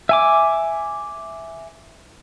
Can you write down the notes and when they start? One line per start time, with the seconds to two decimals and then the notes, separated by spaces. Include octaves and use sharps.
0.09 E5 G#5 D6